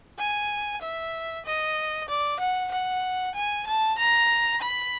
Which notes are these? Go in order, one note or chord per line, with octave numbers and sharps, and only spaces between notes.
G#5
E5
D#5
D5
F#5
F#5
G#5
A5
A#5
B5